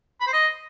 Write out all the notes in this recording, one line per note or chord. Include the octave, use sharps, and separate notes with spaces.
B5
C5
D#5